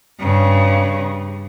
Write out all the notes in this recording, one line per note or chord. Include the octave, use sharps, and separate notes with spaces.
G2 C#3